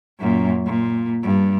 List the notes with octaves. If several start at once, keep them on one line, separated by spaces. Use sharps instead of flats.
F#2 A#2
A#2
G2